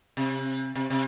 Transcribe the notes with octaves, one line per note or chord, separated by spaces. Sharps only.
C3
C3
C3